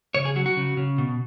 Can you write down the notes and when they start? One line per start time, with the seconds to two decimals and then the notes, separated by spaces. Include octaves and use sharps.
0.15 C#3 C#5
0.25 G#4
0.36 F#3 F#4
0.46 F#4
0.57 C#3
0.77 C#3
0.98 B2